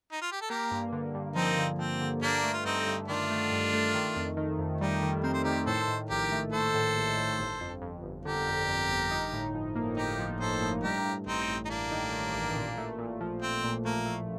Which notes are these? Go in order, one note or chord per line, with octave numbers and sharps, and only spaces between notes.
D#4
F4
G4
A4
A#3 G4 A#4
G2
D3
G2
F3 C4 D#4
D3
F3 C4
D3
G2 A#3 D4
A3
F4
G2 C4 D#4
G2
D#3 D4 F4
A3
G2
A3
D#3
F2
D#3
F2
G3 D#4 G4
D#3
C4 A#4
C5
D#3 G4 A#4
A2 A4 C5
A2
A#1 G4 A#4
A3
A3 A4 C5
A2
A#1
A2
G1
F2
F2
G1
D3 G4 A#4
F2
F2
G1
D#4
A2
F3
A#3
D#4 G4 A#4
F3
A2 A4 C5
A2
G2 G4 A#4
G2
A1 C4 D#4
A1
D#4
A1 A#3 D4
D#3
D#3
A1
A#2
A3
A#2
F3
F3 C4
A#2
A3 A#3
A3